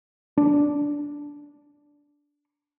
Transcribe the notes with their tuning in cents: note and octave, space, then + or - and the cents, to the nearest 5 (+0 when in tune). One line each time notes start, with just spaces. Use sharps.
D4 -10